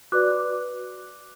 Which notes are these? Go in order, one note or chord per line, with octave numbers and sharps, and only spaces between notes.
F#4 B4 D5 D6 F#6